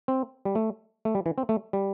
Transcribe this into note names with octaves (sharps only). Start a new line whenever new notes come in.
C4
G3
A3
A3
G3
E3
C4
A3
G3